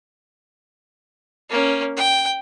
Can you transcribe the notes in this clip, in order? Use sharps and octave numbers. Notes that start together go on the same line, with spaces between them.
A#3 C#4
G5